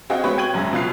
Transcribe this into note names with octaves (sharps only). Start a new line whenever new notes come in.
C4 F#4 G#4 D#5 F5 G5
G#3 B3 C4 F#4 B4 C#5
G5 G#6 D#7 F#7
A#1 F#2 G#3 G#5
B2 F4 F#6 C7 F7